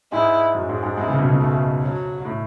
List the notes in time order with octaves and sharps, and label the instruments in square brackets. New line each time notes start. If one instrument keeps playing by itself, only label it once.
[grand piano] G#2 G#3 [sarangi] E4
[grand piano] F#2 F#3
G#2 G#3
G#2 G#3
[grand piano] G#2 G#3 [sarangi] E4
[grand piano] C#2 C#3
B1 B2
B1 B2
[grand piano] G#2 [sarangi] A3
[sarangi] F#3
[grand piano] A2